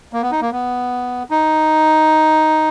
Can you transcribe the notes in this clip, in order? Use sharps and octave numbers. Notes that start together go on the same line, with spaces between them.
A#3
B3
D#4
A#3
B3
D#4